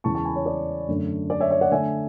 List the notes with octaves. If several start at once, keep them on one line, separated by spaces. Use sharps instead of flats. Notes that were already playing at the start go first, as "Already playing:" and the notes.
E2 C#3 E3 G#3 A5 C#6
A5 C#6
G#5 B5
C#5
D5
F#2 D3 A3
D5
C#5 E5
C#5 E5
D5 F#5
D3 A3 D4 E5 G#5